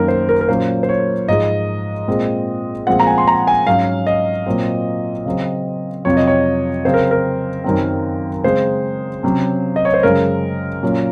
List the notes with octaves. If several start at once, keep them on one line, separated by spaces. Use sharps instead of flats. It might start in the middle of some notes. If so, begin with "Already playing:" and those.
Already playing: F#2 D#3 A#3 C#4 A#4
C5
A#4
A#4
A#2 F#3 A#3 C#4 C5
C5
C#5
G#2 F3 G#3 D#5
A#2 G#3 C4
A#2 F3 G#3 C4 F#5
A#5
G#5
C6
A#5
G#5
G#2 F#3 C#4 F5
D#5
A#2 F#3 C4
C#3 F#3 C4
F2 C3 F#3 C#5
D#5
C#5
C#3 F#3 C4 C5
A#4
A#4
F#2 D#3 F#3 C4
C#3 G#3 C4 C5
C3 F#3 C#4
D#5
C#5
C5
F#2 C#3 G#3 C#4 A#4
A#2 F#3 C#4